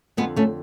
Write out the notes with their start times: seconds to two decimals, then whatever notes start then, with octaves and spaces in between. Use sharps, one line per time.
0.17 F2 D3 G#3 B3
0.36 A3 C#4